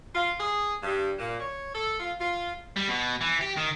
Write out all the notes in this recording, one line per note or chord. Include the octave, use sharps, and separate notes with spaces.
F4
G#4
G2
A#2
C#5
A4
F4
F4
G3
B2
E3
G4
D#3